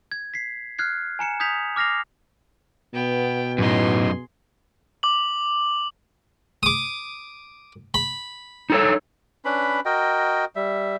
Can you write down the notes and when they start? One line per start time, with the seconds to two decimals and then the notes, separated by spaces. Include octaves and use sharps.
0.12 G#6
0.34 B6 C7
0.79 F6 F#6 G#6 C7
1.19 G#5 A#5 C#7 E7
1.40 D#6 G6 G#6 B6 F7
1.76 D6 F6 A#6 C7 F7
2.94 B2 B3 G5
3.58 F#2 A2 D#4 G#4 C6
5.03 D6 F#7
6.63 D6 D#6
7.94 B5
8.70 D#4 A4 C#5
9.45 C#4 D4 B4 B5
9.85 F#4 A#4 D#5 G5
10.56 G3 E5